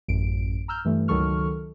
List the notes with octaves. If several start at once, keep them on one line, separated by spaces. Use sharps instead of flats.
A1 F#2 D7
A#5 E6 F6 G6
G2 E3 A3
C#2 D#3 F#3 A4 C#6 F6